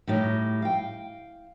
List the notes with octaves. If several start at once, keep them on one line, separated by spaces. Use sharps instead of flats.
A2 G3 D#4 C#5
F5 G5